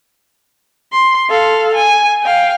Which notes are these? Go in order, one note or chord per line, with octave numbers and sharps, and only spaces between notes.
C6
A4 F5
G#5
F5 G5